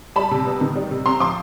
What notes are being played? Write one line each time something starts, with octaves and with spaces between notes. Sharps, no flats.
G3 A5 B5
C3
B3
D#3
G3
C3
C4 A#5 C6
F3 C6 D6